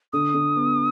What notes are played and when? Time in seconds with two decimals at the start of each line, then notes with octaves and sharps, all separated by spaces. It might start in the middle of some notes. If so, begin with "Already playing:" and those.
0.13 D3 D#6
0.34 D3
0.56 B3